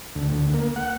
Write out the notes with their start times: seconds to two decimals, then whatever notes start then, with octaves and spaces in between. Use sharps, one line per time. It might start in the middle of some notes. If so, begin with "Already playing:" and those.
0.15 D2
0.32 D2
0.54 A#3
0.76 F#5